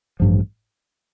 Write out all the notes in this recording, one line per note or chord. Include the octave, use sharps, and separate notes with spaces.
A1 G2 F3